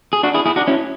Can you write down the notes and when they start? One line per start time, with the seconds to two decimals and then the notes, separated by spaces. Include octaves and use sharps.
0.13 G#4
0.23 D4 F#4
0.34 E4 G#4
0.46 E4 G#4
0.56 D4 F#4
0.67 C#4 E4